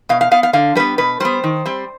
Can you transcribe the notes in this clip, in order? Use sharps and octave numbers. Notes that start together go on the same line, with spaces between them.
B2 F5
F5
B3 F5
F5
D3 F5
G3 B3 B4
B2 B4
G3 B3 C5
D#3
G3 C4